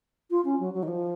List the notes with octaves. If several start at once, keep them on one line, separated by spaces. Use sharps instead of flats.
F4
C#4
F#3
F#3
D#3
F3